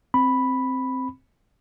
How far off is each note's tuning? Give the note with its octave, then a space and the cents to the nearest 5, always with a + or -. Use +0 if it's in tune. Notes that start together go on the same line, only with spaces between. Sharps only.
C4 +0 B5 +0